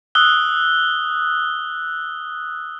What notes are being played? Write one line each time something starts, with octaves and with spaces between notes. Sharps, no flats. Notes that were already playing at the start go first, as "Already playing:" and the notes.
D#6 E6 F#6 G7